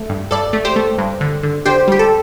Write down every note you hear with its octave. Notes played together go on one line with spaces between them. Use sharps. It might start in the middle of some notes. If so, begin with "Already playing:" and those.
Already playing: A3
G2
G2 A4 D5
A3
G4 C5
A3
G2
D3
D3
D3 G4 C5
G3 G4
A4